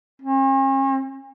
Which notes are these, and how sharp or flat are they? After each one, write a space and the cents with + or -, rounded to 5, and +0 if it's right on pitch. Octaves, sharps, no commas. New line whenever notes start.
C#4 -45